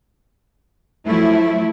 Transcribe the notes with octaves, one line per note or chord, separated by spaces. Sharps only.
F3 F#3 A3 E4